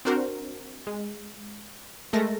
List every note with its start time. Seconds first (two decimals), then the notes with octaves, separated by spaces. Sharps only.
0.05 C4 D4 F#4 A#4 C5
0.87 G#3
2.13 G#3 A3 A#4 A5 A#6